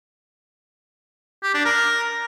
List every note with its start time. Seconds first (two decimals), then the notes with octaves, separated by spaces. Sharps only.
1.43 G4
1.54 D4
1.65 A#4